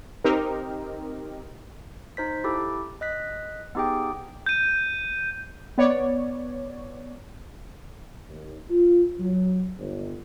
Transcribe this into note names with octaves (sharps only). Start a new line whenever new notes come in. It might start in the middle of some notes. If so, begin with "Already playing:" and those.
C4 D#4 G4 A#4
D#4 C5 B6
E4 G4 A4
D#5 F#6 B6
B3 D#4 G4 G#4 G5
G6 D#7
B3 C#5 D5
D#2
F4
F#3
G1